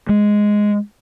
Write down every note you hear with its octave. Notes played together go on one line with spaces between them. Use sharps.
G#3